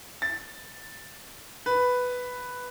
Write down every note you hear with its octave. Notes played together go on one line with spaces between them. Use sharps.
A6
B4